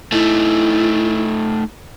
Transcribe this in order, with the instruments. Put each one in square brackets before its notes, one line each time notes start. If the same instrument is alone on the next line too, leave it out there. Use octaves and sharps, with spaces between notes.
[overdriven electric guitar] A3 D#4 [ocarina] E4